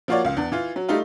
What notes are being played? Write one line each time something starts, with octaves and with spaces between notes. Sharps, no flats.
F3 A#3 F4 F#4 C#5 D5
C#2 F5
E2 D4
E3 F4
F#3
G3 A3 D#4 F4